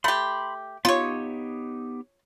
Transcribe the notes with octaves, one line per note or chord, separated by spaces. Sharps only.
A3 G4 B5 C6
B3 D#4 F4 G4 C#5